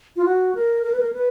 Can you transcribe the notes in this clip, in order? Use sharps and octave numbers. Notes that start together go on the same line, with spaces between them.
F4
F#4
A#4
A#4
B4
A#4
B4